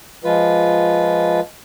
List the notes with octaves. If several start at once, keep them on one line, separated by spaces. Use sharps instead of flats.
F3 G#3 F4 B4